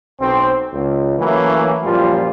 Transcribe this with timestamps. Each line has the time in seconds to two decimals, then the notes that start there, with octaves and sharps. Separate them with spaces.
0.20 B1 C4
0.73 C#2
1.19 E3 F#3 A3 A#3 C#4 E4
1.84 F#2 A#2 F3 G3 F4